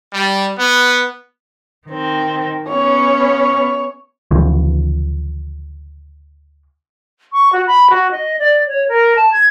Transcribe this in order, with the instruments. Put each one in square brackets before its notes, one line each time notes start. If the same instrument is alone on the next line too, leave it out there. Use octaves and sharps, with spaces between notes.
[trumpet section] G3
B3
[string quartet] D#3 C4
[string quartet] B3 C#4 [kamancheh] C#5
[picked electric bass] D2 C#3 E3 F3
[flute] C#6
F#4
B5
F#4
D#5
D5
C#5
A#4
A5
G#6